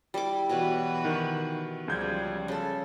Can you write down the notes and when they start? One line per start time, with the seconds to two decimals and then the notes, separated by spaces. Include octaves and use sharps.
0.14 G3 E4 D6
0.49 B2 E3 F#4 B4 C#5
1.05 D#3
1.88 C#2 C#3 F3 G3 G6 G#6
2.48 C#3 A4